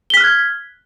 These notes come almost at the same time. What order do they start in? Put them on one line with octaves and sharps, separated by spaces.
G7 B6 F6 F#6 G#6